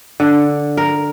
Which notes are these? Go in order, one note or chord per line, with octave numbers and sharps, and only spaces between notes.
D3
A#4